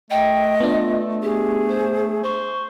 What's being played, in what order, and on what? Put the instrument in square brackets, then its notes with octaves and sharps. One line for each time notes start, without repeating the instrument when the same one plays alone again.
[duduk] A3 [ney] D#5 [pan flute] G5
[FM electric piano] B3 D4 [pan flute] F4
[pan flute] G4 [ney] G#4
[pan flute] C5
[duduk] C5 [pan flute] C#6